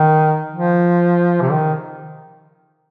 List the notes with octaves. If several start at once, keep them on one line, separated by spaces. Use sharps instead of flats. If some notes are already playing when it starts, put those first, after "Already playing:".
Already playing: D#3
F3
C3
D#3